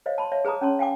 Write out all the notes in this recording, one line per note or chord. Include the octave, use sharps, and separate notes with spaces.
C5 C#5 D#5 F5
A5 B5 C6
C#5 E5 F5
G#4 B4 A5 A#5 D#6
C#4 C#5 A5 C6
F5 G5 G#5 D6